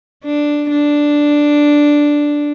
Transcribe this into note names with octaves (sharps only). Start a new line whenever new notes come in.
D4
D4